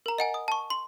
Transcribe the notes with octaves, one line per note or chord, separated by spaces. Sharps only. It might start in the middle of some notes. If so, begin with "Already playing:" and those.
A#4 A#5
D#5 F#5 G#5
D#6
A5 C#6
C6